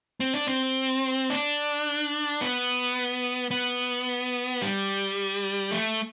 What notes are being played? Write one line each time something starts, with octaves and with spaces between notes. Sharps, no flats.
C4
D4
C4
D4
B3
B3
G3
A3